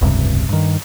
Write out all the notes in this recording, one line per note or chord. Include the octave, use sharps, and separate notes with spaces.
F1 C#2 G2 C3
G2 D#3